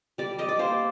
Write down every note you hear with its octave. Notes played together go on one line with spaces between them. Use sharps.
G3 D5
G3 D#5
D5
A#3 C5